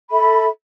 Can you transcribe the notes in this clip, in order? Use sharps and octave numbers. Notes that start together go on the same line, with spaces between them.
A4 E5 B5